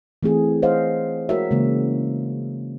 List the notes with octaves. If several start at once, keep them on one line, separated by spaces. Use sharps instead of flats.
E3 A3 C4 G#4
C5 C#5 D#5 F5 F#5
G#3 F#4 A#4 C#5 E5
C#3 E3 G#3 A#3